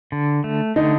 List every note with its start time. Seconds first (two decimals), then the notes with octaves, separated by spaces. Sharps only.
0.12 D3
0.44 A3
0.76 D3 D#4